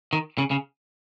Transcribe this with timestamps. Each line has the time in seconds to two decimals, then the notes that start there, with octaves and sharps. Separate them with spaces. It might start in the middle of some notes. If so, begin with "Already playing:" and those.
0.13 D#3
0.38 C#3
0.51 C#3